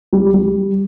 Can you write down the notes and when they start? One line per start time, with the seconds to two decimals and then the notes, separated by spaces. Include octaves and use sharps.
0.13 G3
0.34 G3